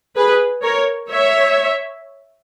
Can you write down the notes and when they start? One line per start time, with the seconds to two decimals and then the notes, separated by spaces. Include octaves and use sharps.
0.16 G#4 B4
0.63 A#4 C#5
1.10 C#5 E5